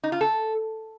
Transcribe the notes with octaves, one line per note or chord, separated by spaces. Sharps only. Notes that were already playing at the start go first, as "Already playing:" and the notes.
D#4
F4
A4